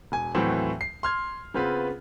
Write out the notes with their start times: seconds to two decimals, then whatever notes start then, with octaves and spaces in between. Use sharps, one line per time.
0.12 E1 G#5
0.35 D#2 A2 E3 F#3 C4
0.81 C7
1.03 C6 F6 G#6
1.54 C#3 B3 C4 F4 B4